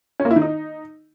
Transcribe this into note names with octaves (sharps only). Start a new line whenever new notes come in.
C#4
A#3
E4
D#3
D#4